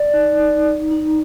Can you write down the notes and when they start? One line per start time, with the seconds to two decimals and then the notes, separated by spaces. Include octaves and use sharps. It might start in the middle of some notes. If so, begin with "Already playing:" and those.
Already playing: D5
0.14 D#4
0.40 D#4
0.65 D#4
0.91 D#4